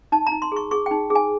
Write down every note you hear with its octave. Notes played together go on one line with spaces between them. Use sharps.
D#4 A5
A#5
D#4
C6
G#4 C#6
G#4 C#6
D#4 G5
G#4
G#5